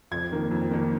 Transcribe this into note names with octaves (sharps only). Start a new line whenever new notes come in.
F2 G#6
D#3 A#3
F2
D#3 A#3